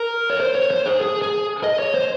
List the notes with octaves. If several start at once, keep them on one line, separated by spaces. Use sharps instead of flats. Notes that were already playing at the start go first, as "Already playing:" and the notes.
Already playing: A#4
C#5
C5
C#5
C5
G#4
G#4
G#4
D#5
C#5
C5